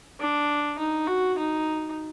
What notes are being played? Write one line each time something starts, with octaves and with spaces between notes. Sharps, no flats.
D4
D#4
F#4
D#4